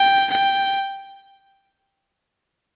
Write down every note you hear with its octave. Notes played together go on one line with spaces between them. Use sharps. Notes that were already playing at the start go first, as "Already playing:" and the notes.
Already playing: G5
G5